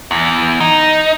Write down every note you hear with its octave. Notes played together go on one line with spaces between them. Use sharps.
E2
D#4